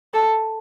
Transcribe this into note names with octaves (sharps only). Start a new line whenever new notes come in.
A4